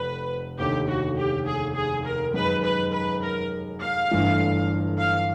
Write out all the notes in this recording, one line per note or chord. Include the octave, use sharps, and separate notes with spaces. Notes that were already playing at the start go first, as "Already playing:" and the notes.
Already playing: F1 F2 B4
F1 D#2 D3 G4
F#4
G4
G#4
G#4
A#4
F#2 D#3 G#3 B4
B4
B4
A#4
F5
G1 G2 E3 A3 D4
F5